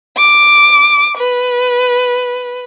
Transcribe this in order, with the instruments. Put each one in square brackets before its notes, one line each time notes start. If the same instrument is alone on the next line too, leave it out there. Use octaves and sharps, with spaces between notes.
[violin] D6
B4